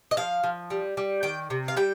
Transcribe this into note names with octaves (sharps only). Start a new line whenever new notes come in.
D#5
F3 F5
F3
G3
G3
D#3 G5
C3
F5
G3 G5